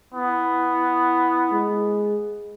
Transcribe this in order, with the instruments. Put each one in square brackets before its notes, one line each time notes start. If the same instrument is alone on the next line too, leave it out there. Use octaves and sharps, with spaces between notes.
[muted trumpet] B3 [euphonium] E4
[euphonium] G#3